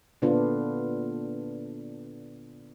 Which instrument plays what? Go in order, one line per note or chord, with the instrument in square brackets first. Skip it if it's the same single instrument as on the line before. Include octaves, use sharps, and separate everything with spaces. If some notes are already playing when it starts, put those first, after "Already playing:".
[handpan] A#2 D3 B3 D4 F4